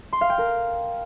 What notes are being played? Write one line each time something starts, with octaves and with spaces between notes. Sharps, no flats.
C6
F5
G5
A#4